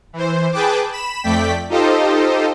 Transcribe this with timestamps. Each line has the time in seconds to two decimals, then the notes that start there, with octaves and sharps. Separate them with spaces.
0.13 E3 C5
0.52 G#4 B4 G5 A5 D6
0.92 B5 E7
1.23 F2 A3 D5 G5 B6
1.69 D#4 F4 G4 A4 C5 D#5